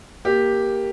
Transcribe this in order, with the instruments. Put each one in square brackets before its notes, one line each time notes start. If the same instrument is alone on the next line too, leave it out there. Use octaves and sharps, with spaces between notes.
[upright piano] A#3 G4